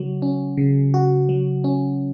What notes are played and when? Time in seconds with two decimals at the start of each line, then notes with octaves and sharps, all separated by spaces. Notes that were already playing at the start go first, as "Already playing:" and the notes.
Already playing: C#3 F#3 F#4
0.22 C#4
0.57 C#3
0.94 F#4
1.29 F#3
1.64 C#4